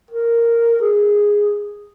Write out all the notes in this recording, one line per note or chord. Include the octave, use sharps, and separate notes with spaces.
A#4
G#4